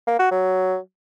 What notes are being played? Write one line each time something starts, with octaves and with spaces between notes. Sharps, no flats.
A#3
F#4
F#3